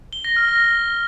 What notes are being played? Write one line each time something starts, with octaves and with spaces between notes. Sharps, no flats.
G7
A#6
F6
A#6